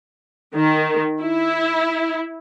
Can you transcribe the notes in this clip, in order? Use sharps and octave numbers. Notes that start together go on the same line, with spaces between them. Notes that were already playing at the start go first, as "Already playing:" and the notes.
D#3
E4